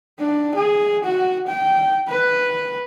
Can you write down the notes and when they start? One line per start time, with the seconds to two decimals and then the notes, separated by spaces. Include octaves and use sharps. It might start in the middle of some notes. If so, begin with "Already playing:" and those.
0.19 D4
0.55 G#4
1.04 F#4
1.47 G5
2.08 B4